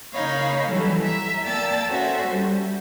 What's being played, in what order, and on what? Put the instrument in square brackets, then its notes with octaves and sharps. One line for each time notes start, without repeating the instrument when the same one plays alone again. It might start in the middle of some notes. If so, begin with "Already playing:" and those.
[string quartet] C#3 A#3 D#4 C#5 F5 B5
E3 F#3 G3 A4
E5 A#5
A#3 D5 G5 A5 E6 A6
C#4 F#4 A4 C5 E5
G3